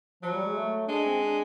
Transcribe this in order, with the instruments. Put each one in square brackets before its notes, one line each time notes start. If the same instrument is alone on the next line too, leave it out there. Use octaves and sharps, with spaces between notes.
[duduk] F3 [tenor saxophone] F#3
[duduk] G3
G#3
A3
[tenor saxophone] G#3 [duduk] D4
[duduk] C4
D4